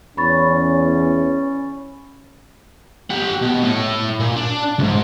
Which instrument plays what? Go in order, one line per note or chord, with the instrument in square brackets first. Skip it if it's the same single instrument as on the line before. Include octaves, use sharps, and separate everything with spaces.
[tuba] E2 [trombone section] C#4 [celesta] B5 C#6 A6
[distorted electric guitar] G4 F#5
B2
A2 A3
A#2
D4
C#2 G#2